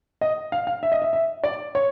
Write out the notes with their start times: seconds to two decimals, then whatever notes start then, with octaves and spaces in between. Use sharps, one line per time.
0.21 D#5
0.52 F5
0.67 F5
0.83 E5
0.92 D#5
1.02 E5
1.13 E5
1.44 D5
1.75 C#5